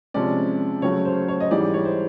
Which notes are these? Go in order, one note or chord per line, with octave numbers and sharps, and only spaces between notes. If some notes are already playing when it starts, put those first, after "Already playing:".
C3 F3 G#3 C#4 D5
C#3 F#3 A3 C#5
C5
C#5
D#5
G#2 E3 G3 D5
C#5
C5